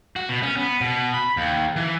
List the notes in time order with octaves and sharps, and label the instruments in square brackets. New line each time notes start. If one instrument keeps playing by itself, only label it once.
[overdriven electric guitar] F#4
B2
C#4
B3
B2
B5
D#2
E3